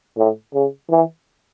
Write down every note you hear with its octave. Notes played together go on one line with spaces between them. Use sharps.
A2
C#3
E3